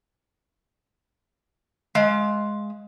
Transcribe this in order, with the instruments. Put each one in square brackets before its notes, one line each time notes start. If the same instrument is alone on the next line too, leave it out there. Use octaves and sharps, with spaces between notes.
[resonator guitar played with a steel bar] G#3 F5